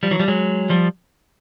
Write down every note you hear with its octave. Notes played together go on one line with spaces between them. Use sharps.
F3 G3
E3 F#3
F3 G3
F#3 G#3
F3 G3